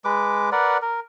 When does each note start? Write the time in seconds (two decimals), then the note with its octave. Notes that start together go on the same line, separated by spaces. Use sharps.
0.05 G#3 B4 D6
0.52 A#4 B4 D5 F#5
0.82 A#4